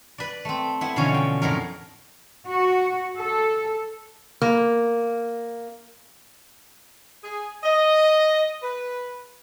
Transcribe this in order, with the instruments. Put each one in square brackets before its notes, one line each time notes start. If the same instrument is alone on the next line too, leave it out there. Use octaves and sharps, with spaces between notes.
[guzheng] B4 D5
A3 C4
B3 E4
B2 D3 E3 F3 C#4 C#5
G5
F2 A2 F#3 D#4 A#4
[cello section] F#4
A4
[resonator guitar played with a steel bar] A#3
[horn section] G#4
D#5
B4